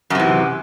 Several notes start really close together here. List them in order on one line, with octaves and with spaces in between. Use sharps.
F#2 C3 E3